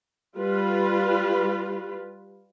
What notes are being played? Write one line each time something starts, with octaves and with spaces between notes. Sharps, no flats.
G3 F4 B4